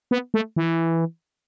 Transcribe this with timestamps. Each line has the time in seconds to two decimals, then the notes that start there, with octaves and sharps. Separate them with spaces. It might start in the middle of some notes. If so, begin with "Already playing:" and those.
0.11 B3
0.34 A3
0.56 E3